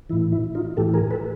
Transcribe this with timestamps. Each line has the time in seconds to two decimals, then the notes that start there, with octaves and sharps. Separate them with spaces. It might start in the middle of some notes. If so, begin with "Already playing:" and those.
0.10 A2 E3 E4
0.32 E4
0.55 D#4 F4
0.77 A2 E3 G4 A4
0.94 G#4 A#4
1.11 A4 B4